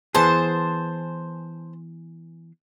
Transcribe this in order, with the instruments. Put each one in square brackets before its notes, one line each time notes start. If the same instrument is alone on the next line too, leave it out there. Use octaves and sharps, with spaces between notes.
[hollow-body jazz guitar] E3 B3 G#4 [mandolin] C5 A5